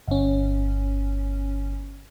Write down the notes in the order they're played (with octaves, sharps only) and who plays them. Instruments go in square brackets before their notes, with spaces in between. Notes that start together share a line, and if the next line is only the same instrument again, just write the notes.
[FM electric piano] G1 C#4